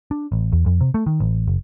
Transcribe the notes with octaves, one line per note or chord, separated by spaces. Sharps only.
D4
A1
E2
F2
C3
A3
D#3
A1
F#1